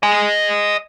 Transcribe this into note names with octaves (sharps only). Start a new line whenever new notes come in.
D#5 G#5